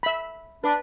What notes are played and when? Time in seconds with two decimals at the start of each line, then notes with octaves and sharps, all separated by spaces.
0.03 E5 B5
0.64 D4 B4